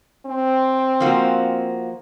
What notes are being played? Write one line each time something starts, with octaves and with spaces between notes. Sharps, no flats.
C4
F3 A#3 F#4